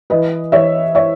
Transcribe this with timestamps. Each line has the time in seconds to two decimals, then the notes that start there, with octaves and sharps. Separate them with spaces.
0.10 E3 B4 D#5
0.52 E3 C#5 E5
0.95 C#5 E5